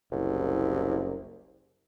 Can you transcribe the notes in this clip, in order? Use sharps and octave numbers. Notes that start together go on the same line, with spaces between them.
F#1 C2